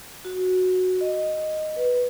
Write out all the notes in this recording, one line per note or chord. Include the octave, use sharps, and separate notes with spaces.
F#4
D#5
B4